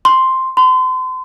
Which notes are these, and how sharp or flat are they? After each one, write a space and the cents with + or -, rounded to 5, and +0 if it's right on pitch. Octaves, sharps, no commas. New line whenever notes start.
C6 +0
C6 -35